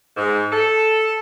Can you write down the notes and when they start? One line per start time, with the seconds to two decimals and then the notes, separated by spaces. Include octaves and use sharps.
0.17 G#2
0.52 A4